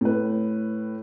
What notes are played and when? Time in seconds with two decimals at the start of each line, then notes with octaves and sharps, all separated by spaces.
0.01 A2 B4